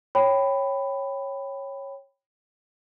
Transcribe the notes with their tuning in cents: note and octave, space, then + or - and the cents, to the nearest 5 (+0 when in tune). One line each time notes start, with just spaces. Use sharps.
C#5 -10 G5 +0 B5 +10